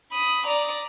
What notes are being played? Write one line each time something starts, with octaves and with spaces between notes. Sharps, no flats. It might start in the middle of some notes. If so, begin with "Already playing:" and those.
B5 D#6
D5 A#5